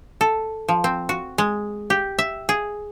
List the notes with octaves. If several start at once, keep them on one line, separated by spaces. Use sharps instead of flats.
A4
F3
C4
F#4
G#3
G4
E5
G#4